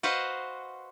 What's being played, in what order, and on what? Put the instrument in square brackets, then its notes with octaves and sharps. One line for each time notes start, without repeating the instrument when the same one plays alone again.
[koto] F#4 B4 C5 D#5 F5 F#5